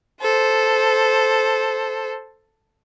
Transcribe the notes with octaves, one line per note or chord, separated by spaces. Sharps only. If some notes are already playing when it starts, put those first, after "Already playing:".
A4 C5